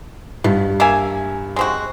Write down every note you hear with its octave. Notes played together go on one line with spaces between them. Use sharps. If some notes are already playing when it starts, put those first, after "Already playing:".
G2 B2
A#3 E5 G#5
G#3 C4 F#4